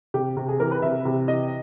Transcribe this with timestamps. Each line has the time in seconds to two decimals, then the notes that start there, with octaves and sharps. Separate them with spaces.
0.14 C3 G4
0.37 C3
0.49 G#4
0.60 E3 A#4
0.71 B4
0.82 C3 E5
1.05 C3
1.28 E3 D#5